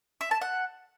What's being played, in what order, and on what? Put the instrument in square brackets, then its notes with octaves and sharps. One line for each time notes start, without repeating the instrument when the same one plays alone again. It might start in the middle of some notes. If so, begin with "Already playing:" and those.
[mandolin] E5
A5
F#5